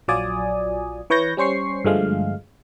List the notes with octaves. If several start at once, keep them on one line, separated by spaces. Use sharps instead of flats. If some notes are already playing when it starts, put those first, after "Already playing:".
A#1 F#3 F4 D5 G#5 D#6
E3 B4 C#5 C#6 G6 A#6
G3 C#4 C5 C#6 C7
G2 D3 F3 G#3 A3 F5